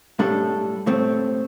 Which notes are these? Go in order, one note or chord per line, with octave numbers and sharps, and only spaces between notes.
A2 G3 D4 A4
A2 A3 C4